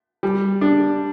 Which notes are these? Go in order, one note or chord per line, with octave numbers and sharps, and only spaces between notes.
G3
D4